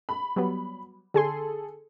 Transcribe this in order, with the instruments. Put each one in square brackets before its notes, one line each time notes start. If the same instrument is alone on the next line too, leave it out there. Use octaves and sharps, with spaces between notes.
[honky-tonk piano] B5
[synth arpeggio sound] F#3 G3 B3
[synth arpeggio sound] D3 G#5 C6 [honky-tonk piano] G#4 A4